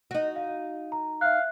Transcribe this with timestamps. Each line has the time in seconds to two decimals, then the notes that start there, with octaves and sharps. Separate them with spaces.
0.11 D#4 F#4
0.36 F5
0.92 A#5
1.21 E5 F5 F#6